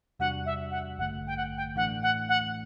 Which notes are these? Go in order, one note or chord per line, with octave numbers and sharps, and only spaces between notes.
E2 C3 G3 D4 F#4 F#5
E5
F#5
A1 G2 D3 A3 F#5
G5
F#5
G5
A2 E3 A3 D4 F#5
F#5
F#5